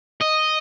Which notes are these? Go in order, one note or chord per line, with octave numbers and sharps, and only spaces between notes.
D#5